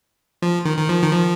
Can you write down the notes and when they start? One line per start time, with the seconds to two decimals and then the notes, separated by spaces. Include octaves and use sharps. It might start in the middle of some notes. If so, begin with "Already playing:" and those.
0.42 F3
0.65 D#3
0.77 D#3
0.89 F3
1.02 D#3
1.12 F3